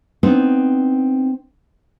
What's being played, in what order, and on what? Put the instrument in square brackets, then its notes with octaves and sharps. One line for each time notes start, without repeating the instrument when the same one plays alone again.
[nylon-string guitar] B3 C4 D4 D#4